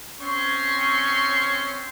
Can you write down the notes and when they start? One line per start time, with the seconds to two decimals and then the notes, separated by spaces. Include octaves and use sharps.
0.19 C4 C#4 C#5 C6 C#6